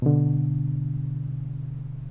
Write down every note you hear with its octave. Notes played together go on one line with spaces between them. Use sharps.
B2 D3